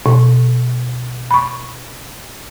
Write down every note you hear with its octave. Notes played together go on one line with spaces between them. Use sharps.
B2
B5 C#6